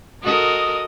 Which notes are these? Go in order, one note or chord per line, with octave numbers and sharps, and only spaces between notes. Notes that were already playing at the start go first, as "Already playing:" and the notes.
F#4 A4 A#4 D#5 D#6